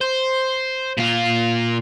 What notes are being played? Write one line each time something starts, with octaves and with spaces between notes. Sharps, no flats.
C5
A#2 F4